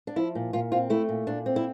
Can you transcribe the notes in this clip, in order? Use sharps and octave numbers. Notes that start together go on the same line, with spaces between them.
D4
F3 E4
A#2
A#2 F4
C4 F4
A3 E4
A#2
A#2 D4
C4
E4